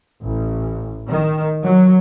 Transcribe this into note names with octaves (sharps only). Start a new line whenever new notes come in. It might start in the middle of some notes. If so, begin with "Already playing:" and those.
A1
D#3
F#3